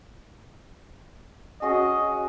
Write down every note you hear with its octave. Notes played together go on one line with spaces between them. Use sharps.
C#4 F#4 G#4 D#5